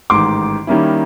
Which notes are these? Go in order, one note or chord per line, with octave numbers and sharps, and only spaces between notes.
A1 G#2 D#3 C6 D6
D#3 G3 A#3 C#4 E4